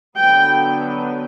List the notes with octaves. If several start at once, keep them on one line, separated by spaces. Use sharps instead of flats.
D3 F#3 B3 G5